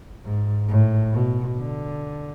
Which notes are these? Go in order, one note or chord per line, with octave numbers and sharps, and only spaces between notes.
G#2
A2
B2
D3